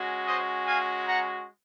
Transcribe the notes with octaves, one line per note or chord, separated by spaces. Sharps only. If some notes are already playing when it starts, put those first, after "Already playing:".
Already playing: G#3 C#4 F#4
C5 D#5
F5 G#5
F#5 A#5